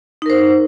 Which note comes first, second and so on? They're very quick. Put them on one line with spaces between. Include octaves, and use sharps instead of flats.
D#4 A#4 C5